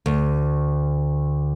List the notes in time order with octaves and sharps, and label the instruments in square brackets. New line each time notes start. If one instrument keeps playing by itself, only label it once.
[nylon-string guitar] D2